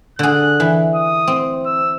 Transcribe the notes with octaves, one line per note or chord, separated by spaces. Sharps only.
D3 G#4 F#6
E3
D#6
C4
E6